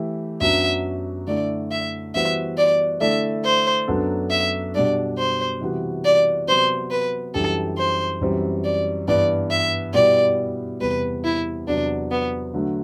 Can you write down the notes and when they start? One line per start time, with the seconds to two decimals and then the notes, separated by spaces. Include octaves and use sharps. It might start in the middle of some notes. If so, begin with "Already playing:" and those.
Already playing: E3 A3 E4 G4
0.41 F#2 F#3 B3 D4 E5
1.27 D3 A3 E4 D5
1.71 E5
2.14 E3 G3 B3 F#4 C5 E5
2.57 D5
3.01 D3 A3 E4 A4 D5 E5
3.44 C5
3.88 F#2 F#3 B3 D4 A4
4.30 E5
4.74 B2 G3 D4 D5
5.18 C5
5.61 C3 E3 G3 B3 F#4
6.05 D5
6.47 C3 F#3 B3 C5
6.91 B4
7.34 F#2 E3 G3 D4 G4 A4
7.78 C5
8.21 F#2 E3 G3 C4
8.64 D5
9.07 G2 E3 B3 D5
9.51 E5
9.94 B2 G3 B3 E4 G4 D5
10.81 E2 C3 G3 B4
11.24 E4
11.67 E2 C3 F#3 D4
12.11 B3
12.54 D3 F#3 A3